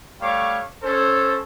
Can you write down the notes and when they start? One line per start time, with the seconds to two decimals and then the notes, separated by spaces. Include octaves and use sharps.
0.20 G3 A3 C#5 F5 C#6 D6
0.83 C#4 A4 C5